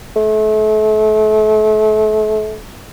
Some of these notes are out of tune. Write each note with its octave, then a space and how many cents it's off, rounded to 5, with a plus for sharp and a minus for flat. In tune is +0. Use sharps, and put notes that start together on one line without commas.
A3 -35